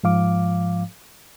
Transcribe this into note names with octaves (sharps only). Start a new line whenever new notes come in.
G#2 F3 F5 D6